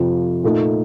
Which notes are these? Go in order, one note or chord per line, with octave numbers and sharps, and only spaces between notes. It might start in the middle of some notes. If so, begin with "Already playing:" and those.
Already playing: F2 C3 F3
A#2 A3 D#4